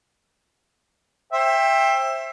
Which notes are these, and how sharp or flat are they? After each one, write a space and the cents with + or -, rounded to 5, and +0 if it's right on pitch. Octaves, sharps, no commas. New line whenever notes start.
C5 +30 E5 +5 G5 +15